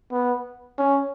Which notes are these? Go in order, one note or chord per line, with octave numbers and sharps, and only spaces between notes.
B3
C#4